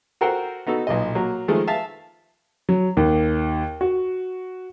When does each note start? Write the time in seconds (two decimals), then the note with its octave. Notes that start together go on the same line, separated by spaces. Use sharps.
0.21 F#4 A4 A#4 C5 F#5 G5
0.67 B3 D#4 F#4 A4
0.87 B1 A#2 D#5
1.15 F#3 A#3
1.48 D#3 F3 G#3 A3
1.67 E5 F5 A5
2.69 F#3
2.97 D#2
3.81 F#4